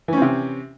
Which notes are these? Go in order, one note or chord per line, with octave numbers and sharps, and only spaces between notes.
C3 E3 C4 C#4